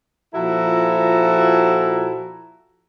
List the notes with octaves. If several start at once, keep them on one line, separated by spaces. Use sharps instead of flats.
A#2 F3 E4 F#4 A4 A#5